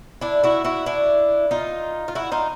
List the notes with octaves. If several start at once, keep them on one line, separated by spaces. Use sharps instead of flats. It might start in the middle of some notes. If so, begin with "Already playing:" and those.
D4 E4
E4 F#4
E4 F#4
D4 E4
D#4 F4
F4
E4 F#4
D#4 F4